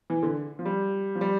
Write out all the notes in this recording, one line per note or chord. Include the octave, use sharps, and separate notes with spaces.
E3
D3
F3
G3
F3
G3